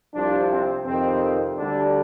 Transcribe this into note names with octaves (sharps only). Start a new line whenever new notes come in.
C2 C3 F3 D4
C4
F2 C3 D#3 C4
D2 D3 G3 D4